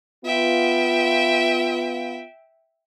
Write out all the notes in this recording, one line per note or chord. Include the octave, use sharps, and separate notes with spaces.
B3 F4 E5 G5